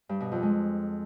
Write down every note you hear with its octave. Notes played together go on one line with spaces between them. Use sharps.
G2
B2
F2
G#3